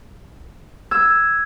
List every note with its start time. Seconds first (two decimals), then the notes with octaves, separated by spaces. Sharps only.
0.91 E6 G#6